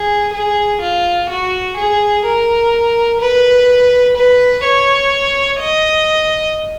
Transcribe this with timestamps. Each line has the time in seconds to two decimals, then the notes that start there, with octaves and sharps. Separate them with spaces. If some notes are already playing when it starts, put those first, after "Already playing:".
Already playing: G#4
0.33 G#4
0.81 F4
1.29 F#4
1.77 G#4
2.25 A#4
3.21 B4
4.17 B4
4.65 C#5
5.61 D#5